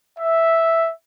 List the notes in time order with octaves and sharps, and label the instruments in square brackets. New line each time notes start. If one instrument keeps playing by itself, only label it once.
[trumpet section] E5